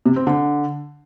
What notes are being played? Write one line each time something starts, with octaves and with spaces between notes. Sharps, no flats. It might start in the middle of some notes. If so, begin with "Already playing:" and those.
C3
C4
D3